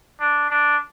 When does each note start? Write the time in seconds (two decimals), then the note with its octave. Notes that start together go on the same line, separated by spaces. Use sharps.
0.20 D4
0.50 D4